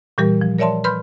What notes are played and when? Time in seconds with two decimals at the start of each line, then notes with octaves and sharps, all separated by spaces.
0.18 A#2 E3 G3 G4 A#4
0.41 F3
0.59 A#4 C#5 D5 E5 A5 C6
0.84 B4 B5 C6 F6 G6